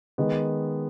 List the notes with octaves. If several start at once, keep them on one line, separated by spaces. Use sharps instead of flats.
D#3 G#3 B3